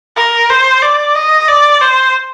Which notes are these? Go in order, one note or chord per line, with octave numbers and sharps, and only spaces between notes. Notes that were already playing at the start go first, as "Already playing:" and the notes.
A#4
C5
D5
D#5
D5
C5